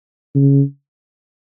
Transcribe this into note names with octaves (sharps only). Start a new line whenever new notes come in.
C#3